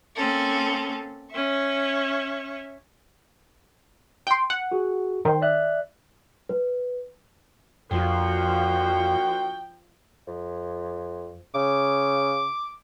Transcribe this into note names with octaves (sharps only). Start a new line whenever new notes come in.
A#3 C4 C#4 A4
C#4 E5 C#6
G5 C6
F#5
F#4 G#4
D#3 C5 G5
D5 E5 F#6
B4
F2 F3 A#3 D4 F#4 G5
F2
C#3 D6